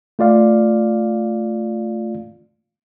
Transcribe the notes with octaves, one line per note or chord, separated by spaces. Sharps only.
A3 F4 D5 F5